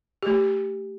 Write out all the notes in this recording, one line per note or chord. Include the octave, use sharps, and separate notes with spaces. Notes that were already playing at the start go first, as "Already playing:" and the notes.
A3 G4